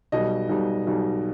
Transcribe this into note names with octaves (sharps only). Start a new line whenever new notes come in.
B1 B2 G3 D#5
B1 B2 G3
B1 B2 G3